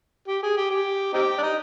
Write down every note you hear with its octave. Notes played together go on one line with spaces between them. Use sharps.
G4
G#4
G4
G4
C4 D#4 G4
D4
D#4